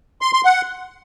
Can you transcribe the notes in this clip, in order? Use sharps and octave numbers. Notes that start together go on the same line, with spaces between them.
C6
C6
F#5